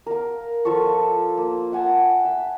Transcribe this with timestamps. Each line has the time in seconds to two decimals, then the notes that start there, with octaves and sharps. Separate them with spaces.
0.06 A#4 F5
0.65 F3 F4 A4 C#6
0.85 A4 D5
1.38 A#3
1.72 E5 F#5 G#5 A5
2.25 E5